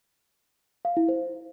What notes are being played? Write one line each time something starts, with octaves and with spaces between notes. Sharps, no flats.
F5
E4
C5